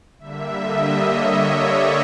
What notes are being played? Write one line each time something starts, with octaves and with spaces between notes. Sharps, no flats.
D3 G3 A#3 E5
D#5
C#5
D5